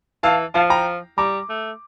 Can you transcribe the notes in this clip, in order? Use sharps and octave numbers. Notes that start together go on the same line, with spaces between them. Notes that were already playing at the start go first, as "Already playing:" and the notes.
E3 F5 A5
F3 F5 A5
G5 A#5
G3 A#5 D6
A3